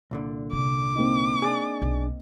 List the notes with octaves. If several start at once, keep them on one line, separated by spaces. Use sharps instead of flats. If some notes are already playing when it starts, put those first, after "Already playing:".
C2 A#2 D3
C3 C#4 D6
A#3 C4 D#4
D4 G#4
B1 F#2